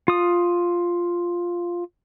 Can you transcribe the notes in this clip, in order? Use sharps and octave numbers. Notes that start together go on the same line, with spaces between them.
F4 D#6